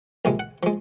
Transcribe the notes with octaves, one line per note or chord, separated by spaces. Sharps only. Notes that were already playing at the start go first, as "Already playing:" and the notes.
A#1 C3 G#3
F#5
F3 G#3